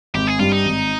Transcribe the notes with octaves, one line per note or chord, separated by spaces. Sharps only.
G#1 G4
G#4
G2 G3 F4
D#4
G#1